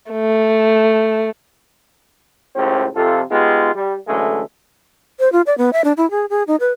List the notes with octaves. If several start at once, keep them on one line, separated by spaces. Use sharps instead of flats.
A3
C#2 A2 C#4 G4 C5
F2 C3 F4 A4
G#3 B3 D#4 F4 G4
G3
F#2 D3 E3 G#3 A3
C5
F4
D5
B3
E5
D4
E4
G#4
G#4
D#4
B4